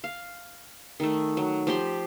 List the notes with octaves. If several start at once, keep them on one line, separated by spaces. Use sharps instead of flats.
F5
D#3 A3
F#3
F3 G4 B5 C6